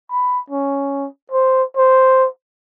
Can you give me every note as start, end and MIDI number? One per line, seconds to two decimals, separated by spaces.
0.11 0.39 83
0.50 1.07 61
1.32 1.63 72
1.77 2.27 72